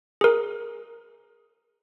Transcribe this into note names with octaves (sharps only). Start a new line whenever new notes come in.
G#4 A#4